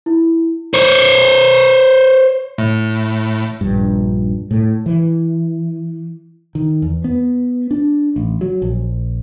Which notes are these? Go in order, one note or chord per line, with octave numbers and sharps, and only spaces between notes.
E4
C5 C#5
A2
A#1 G2
A2
E3
D#3
E2
B3
D4
A1
F#3
A#1